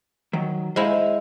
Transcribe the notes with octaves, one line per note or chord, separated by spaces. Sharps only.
D#3 F#3
G#3 E4 C5 F5 G#5